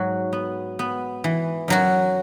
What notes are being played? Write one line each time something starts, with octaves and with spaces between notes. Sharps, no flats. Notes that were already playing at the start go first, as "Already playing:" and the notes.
Already playing: G#2 F#3 F#4
B3
B3
E3
F#2 F#3 F#4